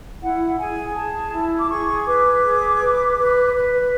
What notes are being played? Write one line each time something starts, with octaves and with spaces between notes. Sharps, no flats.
E4 F#5
G#4 G#5
G#4 A5
E4
D6
G#4 C#6
B4 D6
G#4
B4
B4
B4